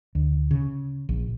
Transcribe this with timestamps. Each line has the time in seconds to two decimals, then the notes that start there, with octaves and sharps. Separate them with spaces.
0.15 D2
0.51 C#3
1.09 A#1